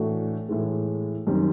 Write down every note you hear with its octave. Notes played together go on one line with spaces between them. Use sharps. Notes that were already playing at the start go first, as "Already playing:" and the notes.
Already playing: A2 E3 A3 D4 F#4
A2 E3 G#3
F#2 D#3 G3 C4 D#4